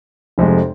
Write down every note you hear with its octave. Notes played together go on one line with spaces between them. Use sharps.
F1 F2 C3 G#3